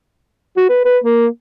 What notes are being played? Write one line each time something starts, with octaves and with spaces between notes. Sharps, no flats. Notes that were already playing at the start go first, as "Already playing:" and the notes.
F#4
B4
B4
A#3